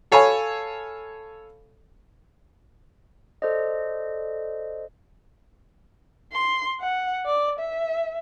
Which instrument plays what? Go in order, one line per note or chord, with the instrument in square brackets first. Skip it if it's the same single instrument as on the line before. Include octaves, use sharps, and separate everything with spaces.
[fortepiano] A4 C#5 F5 G#5 B5
[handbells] A4 C5 D5 D#5
[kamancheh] C6
F#5
D5
E5